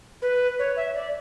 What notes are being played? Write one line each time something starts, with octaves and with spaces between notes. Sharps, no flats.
B4
C#5
E5
D5